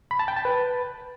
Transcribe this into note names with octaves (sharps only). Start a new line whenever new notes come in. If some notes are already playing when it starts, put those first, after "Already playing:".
B5
A5
G5
A5
B4